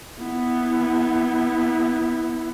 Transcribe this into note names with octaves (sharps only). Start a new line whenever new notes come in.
B3 E4